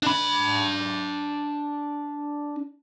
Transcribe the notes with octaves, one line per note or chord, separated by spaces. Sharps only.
D4 B5